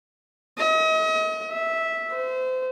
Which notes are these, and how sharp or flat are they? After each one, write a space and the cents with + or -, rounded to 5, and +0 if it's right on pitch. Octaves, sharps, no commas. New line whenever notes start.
D#5 +40
E5 -5
C5 -30